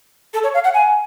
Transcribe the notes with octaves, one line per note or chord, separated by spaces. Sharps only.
A4
C#5
F5
F#5
G#5